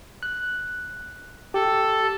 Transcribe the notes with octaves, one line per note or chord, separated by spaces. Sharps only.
F#6
G4 A4